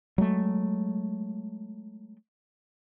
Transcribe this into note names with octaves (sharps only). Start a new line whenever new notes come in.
F#3 G#3 A3